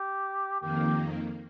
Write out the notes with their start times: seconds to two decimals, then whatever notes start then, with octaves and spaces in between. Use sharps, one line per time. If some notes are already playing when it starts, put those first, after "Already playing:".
Already playing: G4
0.61 F2 D#3 A#3 G4